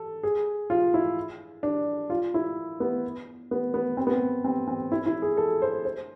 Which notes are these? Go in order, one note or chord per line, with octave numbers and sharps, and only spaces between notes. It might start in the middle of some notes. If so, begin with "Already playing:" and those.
Already playing: A4
G#4
F4
E4
D4
F4
E4
B3
B3
B3
C4
B3
C4
C4
C4
E4
E4
G#4
A4
C5
C5